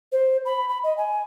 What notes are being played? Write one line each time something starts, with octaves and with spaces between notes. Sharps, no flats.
C5
B5
B5
D#5
G#5